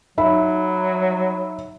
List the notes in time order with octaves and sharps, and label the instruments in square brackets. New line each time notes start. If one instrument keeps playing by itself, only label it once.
[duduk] F#3 [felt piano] D#4 E5 B5